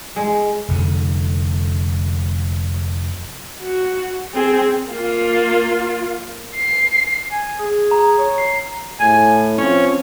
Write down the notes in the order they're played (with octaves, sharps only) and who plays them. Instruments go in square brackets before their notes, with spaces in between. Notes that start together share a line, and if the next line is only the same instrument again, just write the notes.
[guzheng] G#3
[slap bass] F1 D3
[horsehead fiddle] F#4
C4 G#4
[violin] A#3 F4
C7
[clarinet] G#5
G#4
[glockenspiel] A#5
[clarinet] C#5
[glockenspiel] C7
[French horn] A2 [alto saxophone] G#5
[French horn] F3 [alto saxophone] C4 [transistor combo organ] C#4